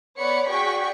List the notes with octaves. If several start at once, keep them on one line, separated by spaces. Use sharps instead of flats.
B3 C#5 D5 F#5 B5 C#7
F#4 G#4 D5 G5 C#6 B6